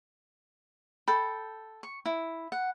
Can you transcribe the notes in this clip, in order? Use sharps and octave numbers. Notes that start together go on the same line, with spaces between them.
A4 G5 B5
C#6
E4
F#5